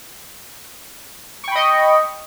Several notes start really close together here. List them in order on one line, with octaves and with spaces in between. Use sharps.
C#6 G5 B5 D#5